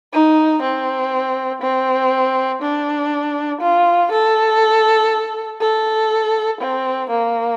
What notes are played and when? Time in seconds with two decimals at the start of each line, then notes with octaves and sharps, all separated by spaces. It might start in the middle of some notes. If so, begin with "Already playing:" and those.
0.13 D#4
0.62 C4
1.62 C4
2.62 D4
3.61 F4
4.12 A4
5.61 A4
6.61 C4
7.10 A#3